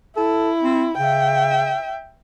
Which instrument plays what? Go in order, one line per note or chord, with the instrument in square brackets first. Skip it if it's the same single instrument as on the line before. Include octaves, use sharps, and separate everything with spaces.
[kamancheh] E4 [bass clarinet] A4
[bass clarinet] C4
[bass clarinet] C#3 [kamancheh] E5 G5